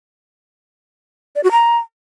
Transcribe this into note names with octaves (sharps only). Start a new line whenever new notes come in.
D5
F#4
A#5